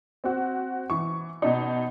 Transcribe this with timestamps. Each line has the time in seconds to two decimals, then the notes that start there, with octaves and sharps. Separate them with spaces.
0.24 C4 F#4
0.90 E3 C#6
1.42 B2 D#4